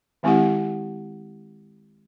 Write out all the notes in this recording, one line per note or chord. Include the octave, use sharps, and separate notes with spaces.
D#3 G#3 C4 E4 G4 F#5